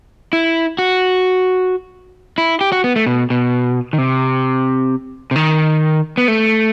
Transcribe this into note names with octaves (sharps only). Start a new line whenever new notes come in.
E4
F#4
E4
G4
F#4
B3
A3
B2
B2
D#3
C3
C3
D#3
B3
A3